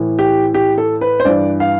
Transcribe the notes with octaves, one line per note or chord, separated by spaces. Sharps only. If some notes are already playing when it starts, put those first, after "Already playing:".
Already playing: A2 E3
G4
G4
A4
B4
C5
G2 E3 D5
F5